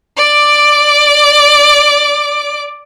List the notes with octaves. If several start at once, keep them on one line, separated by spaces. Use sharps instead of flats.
D5 D6